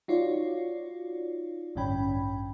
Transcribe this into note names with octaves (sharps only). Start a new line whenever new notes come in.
D#4 F4 F#4 C#5 D5
A1 G2 D3 C#4 G5 B5